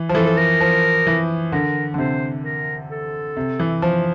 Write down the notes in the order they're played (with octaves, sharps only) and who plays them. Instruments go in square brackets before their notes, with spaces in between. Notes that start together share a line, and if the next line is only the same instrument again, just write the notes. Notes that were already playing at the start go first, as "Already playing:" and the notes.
Already playing: [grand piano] E3
F3
[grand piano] E3 [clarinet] A4
[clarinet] A4
A#4
[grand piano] F3
E3
[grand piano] D3 [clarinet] A#4
[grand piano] D3
[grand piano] C3 [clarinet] C5
[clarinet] A#4
A4
[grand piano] C3
E3
F3